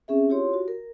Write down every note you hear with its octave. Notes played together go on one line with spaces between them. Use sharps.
C4 C#4 G#4 E5
E4 F4 G4 C#5 C6
F#4
A#4